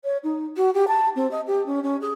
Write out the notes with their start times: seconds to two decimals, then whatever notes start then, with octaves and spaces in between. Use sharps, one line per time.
0.04 C#5
0.23 D#4
0.56 F#4
0.73 G4
0.87 A5
1.15 C4
1.31 D#5
1.46 G4
1.66 C#4
1.83 C#4
2.01 G#4